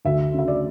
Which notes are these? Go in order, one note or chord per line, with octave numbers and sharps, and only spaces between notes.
D2 E5
C#3 E5
D5